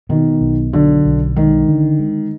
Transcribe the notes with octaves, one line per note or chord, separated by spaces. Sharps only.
B2 D#3
B1
D3 F#3
B1
D#3 G#3
D3
G#3